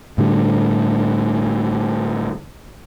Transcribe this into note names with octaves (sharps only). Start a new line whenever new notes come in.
A2 D3 G3